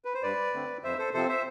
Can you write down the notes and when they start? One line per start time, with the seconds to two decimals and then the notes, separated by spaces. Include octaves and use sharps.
0.05 B4
0.14 C5
0.23 G2 B4 D5
0.54 D3 A3 C4
0.83 F2 C5 E5
0.98 A4 C5
1.13 C3 F3 C4 A4 C5
1.28 C5 E5